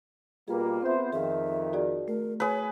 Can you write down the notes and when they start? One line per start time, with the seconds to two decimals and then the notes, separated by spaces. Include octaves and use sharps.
0.48 B2 G3 A#3 F4 G#4 B4
0.82 B3 C4 C5 E5
1.13 F2 D#3 G#4 E5 F5
1.73 F#4 G#4 D5
2.08 A3 A#4
2.40 G#4 B4 C#5